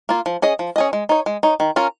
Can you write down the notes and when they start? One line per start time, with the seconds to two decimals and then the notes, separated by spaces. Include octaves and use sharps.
0.09 A#3 F4
0.26 F3
0.42 C#4 G#4 D#5
0.59 F3
0.76 C#4 G#4 D#5
0.93 G#3
1.09 D#4 C#5
1.26 G#3
1.43 D#4 C#5
1.60 D#3
1.76 C#4 F4 A#4